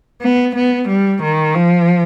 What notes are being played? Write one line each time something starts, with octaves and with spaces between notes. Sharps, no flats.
B3
B3
G3
D#3
F3